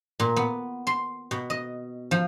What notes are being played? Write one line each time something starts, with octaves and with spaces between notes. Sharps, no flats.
A#2
B3
C6
B2
D#5
F3